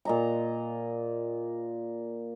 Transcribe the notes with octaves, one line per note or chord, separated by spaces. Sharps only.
A#2 D#5 A#5